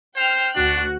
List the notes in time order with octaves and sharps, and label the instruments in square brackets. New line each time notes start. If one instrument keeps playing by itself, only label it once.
[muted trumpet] C5 [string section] G5 F6
[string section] D2 F#4 F#6 [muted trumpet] D4